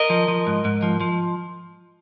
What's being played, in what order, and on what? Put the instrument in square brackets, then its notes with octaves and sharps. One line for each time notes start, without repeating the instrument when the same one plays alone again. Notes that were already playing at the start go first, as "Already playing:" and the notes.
Already playing: [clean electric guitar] A#4 D#5
F3
F3
G#2
G#2
F3
F3